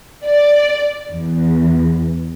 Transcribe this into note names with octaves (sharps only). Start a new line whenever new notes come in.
D5
E2